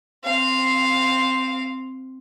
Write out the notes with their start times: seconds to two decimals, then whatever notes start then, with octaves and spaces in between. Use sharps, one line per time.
0.24 C4 F5